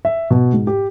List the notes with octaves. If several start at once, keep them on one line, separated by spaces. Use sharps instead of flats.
E5
B2
G#2
G4